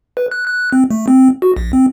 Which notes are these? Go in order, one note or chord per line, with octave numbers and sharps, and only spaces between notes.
B4
F#6
F#6
C4
A3
C4
F#4
A#1
C4